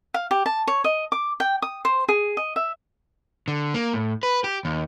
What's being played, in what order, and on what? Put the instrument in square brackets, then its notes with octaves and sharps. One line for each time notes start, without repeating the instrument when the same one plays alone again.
[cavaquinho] F5
G4
A5
C#5
D#5
D6
G5
D#6
C5
G#4
D#5
E5
[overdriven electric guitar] D3
A#3
A2
B4
G4
D#2